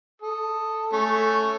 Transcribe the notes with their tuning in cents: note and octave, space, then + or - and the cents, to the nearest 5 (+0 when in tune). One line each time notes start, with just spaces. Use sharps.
A4 +5 D#6 -5
A3 +0 C#4 +0